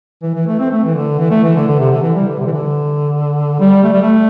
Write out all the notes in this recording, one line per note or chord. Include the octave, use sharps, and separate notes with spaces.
E3
E3
A3
C4
A3
E3
D3
E3
A3
E3
D3
D3
C3
D3
E3
G3
D3
C3
E3
D3
G3
A3
G3
A3